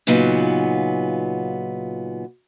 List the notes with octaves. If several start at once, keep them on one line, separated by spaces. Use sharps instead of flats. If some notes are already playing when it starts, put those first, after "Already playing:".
A#2 C#3 F#3 B3 D#4 F4